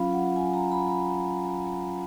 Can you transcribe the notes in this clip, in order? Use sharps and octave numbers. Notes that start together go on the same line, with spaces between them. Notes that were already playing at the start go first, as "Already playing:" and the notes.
Already playing: F#3 C#4 F4 F5 B5
F#5
G#5
A#5
B5
B5